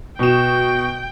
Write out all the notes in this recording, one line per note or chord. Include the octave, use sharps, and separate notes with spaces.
B2 G5 E7